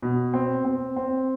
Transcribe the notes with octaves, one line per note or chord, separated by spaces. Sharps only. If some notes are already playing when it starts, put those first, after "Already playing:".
B2
C4
C4
C4